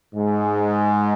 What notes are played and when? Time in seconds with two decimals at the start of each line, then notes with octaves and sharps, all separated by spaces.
0.15 G#2 G#3